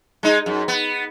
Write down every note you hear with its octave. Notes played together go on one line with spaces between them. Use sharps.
G#3 D#4
F#2
B3